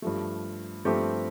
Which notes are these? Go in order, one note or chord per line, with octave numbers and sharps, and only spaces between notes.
G2 F3 A3
G2 F3 A3 C4 G4